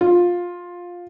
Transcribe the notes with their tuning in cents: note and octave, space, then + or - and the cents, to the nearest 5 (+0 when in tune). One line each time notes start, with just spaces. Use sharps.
F4 +15